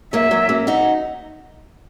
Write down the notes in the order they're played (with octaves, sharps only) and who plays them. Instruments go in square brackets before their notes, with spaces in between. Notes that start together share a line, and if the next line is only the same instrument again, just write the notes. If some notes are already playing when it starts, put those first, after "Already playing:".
[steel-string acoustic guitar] F#3 A#3 [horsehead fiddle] E5
[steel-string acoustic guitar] F#3 A#3
A#3 C#4
D#4 F#4